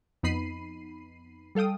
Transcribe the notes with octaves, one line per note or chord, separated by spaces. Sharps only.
F2 B3 D#4 B5 C7 D#7
G3 A4 F5 G5 D#6